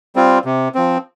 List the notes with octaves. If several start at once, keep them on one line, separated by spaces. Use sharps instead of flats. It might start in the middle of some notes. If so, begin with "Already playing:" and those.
G3 C4 F4
C3
F3 C4